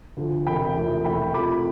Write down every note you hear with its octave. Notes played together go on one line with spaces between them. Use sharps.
D2 D3 F3
E1 D2 C3 G5 B5
E1 E2 C3 F3 A3
E1 E2 B2 A3 G5 B5
F2 C3 F3 B5 D6